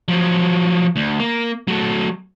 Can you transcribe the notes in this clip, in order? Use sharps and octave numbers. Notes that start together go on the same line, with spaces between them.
F3 F#3
D2
A#3
F#3 A3